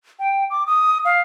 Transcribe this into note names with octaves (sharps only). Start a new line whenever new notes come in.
G5
D6
D#6
F5